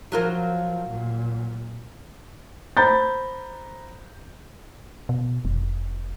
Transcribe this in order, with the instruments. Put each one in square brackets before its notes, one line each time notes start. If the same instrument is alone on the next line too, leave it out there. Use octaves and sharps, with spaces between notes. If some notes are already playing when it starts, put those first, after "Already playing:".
[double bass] F3 [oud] F#3 F4 A#4
[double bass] A#2
[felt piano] C5 A#5 B5 G6 A6
[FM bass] B2
F1